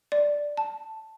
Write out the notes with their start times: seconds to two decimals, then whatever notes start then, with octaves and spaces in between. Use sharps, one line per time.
0.12 D5
0.57 A5